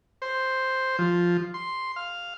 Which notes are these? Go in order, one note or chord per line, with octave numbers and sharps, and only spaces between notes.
C5
F3
C6
F5